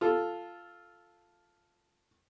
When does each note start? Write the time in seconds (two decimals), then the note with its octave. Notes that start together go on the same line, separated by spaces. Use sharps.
0.01 F4 A4